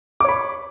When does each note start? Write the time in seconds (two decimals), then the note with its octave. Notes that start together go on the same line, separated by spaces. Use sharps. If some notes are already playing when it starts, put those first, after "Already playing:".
0.20 D6
0.24 C#5
0.28 B5